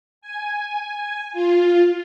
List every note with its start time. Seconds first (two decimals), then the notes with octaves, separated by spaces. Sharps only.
0.21 G#5
1.33 F4